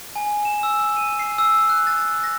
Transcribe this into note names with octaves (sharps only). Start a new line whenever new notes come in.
G#5
E7
E6
D#7
C7
E6
F#6
A6
A#6